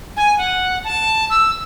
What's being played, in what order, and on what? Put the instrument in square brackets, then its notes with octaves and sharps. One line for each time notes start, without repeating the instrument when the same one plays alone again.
[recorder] G#5
F#5
A5
E6